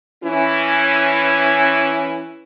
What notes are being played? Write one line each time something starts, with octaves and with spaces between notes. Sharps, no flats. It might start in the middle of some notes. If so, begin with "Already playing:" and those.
E3 C#4 E4